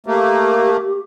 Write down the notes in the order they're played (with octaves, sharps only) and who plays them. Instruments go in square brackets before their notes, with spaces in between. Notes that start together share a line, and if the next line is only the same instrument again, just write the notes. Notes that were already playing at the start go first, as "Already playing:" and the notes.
[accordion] A3 A#3 [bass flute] G4